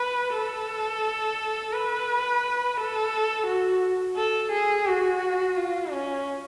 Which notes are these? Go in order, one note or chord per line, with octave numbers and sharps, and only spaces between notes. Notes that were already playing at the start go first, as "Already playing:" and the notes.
Already playing: B4
A4
B4
A4
F#4
A4
G#4
F#4
F4
C#4